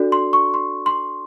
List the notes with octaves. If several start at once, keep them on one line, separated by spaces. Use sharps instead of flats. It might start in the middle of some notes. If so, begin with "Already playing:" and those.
Already playing: D4 F#4 A4 D5
C6
C#6
C6
C6